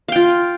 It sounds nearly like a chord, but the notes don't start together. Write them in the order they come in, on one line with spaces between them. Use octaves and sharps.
F5 G5 F4